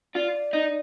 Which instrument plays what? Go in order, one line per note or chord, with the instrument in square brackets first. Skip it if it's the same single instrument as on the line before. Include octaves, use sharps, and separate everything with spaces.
[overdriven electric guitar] F4 [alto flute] D5
[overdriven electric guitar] D#4